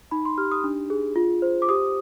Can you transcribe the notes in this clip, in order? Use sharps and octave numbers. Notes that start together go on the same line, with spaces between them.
D#4 B5
C6
G4 F6
D#6
D4
G#4
F4
C5
D6
G4 D#6